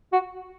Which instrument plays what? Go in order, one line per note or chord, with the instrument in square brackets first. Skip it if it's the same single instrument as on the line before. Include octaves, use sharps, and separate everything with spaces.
[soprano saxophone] F#4